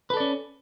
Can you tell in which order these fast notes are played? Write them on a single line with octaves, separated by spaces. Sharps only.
B4 A4 D5 C#4